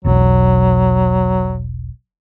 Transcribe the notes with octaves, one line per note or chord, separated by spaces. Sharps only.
E1 B1 F#3